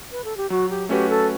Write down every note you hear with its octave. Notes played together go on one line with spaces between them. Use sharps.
B4
A4
G4
F#3 F#4
G4
A3 C#4 F#4 G4 B4
A4